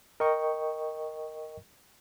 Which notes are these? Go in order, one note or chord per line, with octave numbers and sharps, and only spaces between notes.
A#4 D#5 G5 C#6